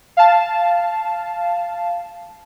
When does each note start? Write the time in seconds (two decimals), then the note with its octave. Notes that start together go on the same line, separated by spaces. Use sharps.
0.17 F5 A5